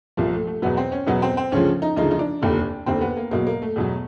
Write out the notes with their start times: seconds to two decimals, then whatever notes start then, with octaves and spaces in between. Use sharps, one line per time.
0.17 C2 A#2 F3 A#3
0.33 A3
0.47 A3
0.62 E2 B2 F#3 B3
0.77 C4
0.92 C#4
1.07 E2 B2 F#3 B3
1.22 C4
1.37 C4
1.52 D2 C#3 F3 C#4
1.82 D#4
1.96 D2 C#3 F3 D#4
2.11 D#4
2.19 D4
2.41 F1 D#2 D3
2.86 F1 D#2 D3 C4
3.01 B3
3.17 A#3
3.31 E2 B2 F#3 A#3
3.47 A#3
3.62 A3
3.76 E2 B2 F#3